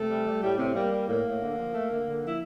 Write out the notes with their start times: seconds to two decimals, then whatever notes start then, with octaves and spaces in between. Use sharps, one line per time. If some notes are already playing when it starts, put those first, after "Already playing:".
Already playing: C3 A3 A4
0.10 G3
0.26 G3
0.42 A2 G3 G4
0.58 A2 C3 C4
0.75 G3 A#3
0.92 G3
1.08 A2 A#3
1.25 A2
1.41 D3
1.58 F3
1.74 A3
1.91 D3
2.07 D3
2.23 F3 E4